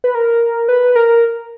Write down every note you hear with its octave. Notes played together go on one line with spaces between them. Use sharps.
B4
A#4
B4
A#4